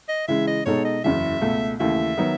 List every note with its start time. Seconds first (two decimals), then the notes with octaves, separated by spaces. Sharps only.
0.08 D#5
0.28 C#3 E3 G#3 E5
0.47 D#5
0.65 B2 G#3 D#4 A4 C#5
0.85 D#5
1.04 F#1 E2 C#3 E3 E5
1.41 C#2 B2 A3
1.80 D#2 C#3 E3 A3 E5
2.18 D#3 F#3 B3